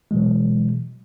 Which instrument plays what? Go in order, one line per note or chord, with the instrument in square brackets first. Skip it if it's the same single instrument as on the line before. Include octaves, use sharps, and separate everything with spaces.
[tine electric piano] B2 E3 F#3 G#3